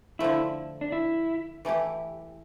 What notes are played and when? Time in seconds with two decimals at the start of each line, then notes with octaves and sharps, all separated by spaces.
0.19 D3 F3 A3 E4
0.81 D4
0.92 E4
1.65 E3 A3 E4 G4